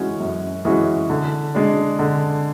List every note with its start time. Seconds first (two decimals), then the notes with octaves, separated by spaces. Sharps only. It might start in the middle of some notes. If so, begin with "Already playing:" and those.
Already playing: E3 G#3 C#4 F#4
0.20 F#2
0.65 E3 G#3 C#4 F#4
1.10 D3
1.55 G#3 D4
1.99 D3